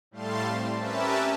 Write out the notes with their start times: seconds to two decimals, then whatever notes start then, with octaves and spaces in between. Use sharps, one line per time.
0.11 A2 G3 A3 F5 A5 C6
0.45 C4
0.79 C#4 G4 A#4 B4 E5 A5